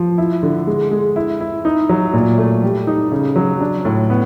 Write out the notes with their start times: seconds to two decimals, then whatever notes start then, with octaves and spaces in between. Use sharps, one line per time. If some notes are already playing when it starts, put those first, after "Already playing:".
Already playing: F3
0.18 E4
0.43 D3
0.67 G#3
0.91 G#3
1.16 E4
1.40 E4
1.65 D#4
1.89 F#3
2.14 A#2
2.38 A3
2.63 G3
2.87 D#4
3.12 C#3
3.36 F#3
3.61 D4
3.85 A2
4.10 B3